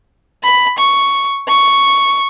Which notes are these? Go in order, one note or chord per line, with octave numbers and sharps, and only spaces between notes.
B5
C#6
C#6